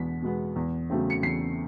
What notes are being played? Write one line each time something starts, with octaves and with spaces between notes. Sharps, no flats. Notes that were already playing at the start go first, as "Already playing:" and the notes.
Already playing: E2 B2 G#3 B3 B6
B2 G#3 B3
E2
C#3 F#3 A3 C4
C#7
E2 C7